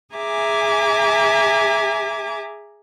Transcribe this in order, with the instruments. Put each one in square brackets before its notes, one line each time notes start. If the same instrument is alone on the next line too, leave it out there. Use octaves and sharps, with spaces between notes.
[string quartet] G#4 E5 G#5 A#5 D6